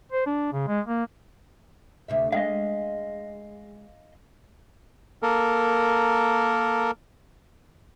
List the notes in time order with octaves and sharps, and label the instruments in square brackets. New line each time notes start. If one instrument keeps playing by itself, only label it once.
[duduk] C5
D4
C#3
G#3
A#3
[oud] D2 C3 E5
[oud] G#3 [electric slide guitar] D#5 F5
[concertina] A#3 A4 A#4